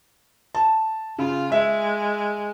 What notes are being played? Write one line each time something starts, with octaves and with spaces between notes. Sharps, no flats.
A5
C#3 F4
G#3 E5